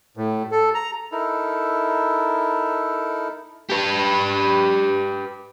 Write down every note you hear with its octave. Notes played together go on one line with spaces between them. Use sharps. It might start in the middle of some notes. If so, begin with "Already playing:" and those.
A2
A4
A#5
D#4 E4 A4 A#4
G4 B4